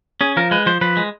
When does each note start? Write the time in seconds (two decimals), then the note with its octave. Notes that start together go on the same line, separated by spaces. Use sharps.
0.21 C#4 G#4
0.37 F3 A#4
0.51 G#3 B4
0.66 F3 C5
0.81 F3 B4
0.97 G#3